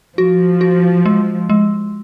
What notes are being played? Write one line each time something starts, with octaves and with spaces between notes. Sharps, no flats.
F3 F#4
F#4
G#3
G#3